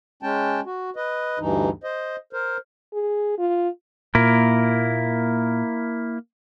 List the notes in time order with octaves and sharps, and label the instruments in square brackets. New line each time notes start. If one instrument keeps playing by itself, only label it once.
[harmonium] G#3 C#4 G5 A5
F#4
B4 D#5
D2 G2 E3 D#4
C5 D#5
A#4 C5
[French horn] G#4
F4
[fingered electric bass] A#2 [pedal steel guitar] A#3 E4 A#4